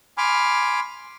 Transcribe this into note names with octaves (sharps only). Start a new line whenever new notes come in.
G#5 B5 C6 D6 F6